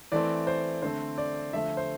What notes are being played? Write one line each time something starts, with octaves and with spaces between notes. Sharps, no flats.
E3 A3 C4 D5
C5
D3 A3 C4 C5
D5
D3 F3 A3 E5
C5